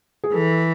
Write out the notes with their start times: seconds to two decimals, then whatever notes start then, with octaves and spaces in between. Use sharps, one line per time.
0.24 G#4
0.34 E3 A4